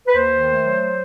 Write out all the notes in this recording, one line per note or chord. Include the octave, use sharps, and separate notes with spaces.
B4
D#2 C5
D#3
A3
F#3